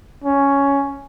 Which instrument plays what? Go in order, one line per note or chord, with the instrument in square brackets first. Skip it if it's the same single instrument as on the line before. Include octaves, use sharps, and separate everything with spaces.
[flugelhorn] C#4